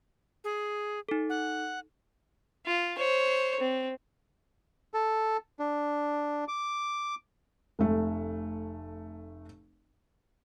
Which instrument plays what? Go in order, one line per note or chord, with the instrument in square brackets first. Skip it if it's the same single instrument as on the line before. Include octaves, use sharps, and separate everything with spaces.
[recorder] G#4
[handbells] D#4 A4
[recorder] F#5
[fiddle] F4
C5 C#5
C4
[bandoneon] A4
D4
D6
[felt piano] F1 A3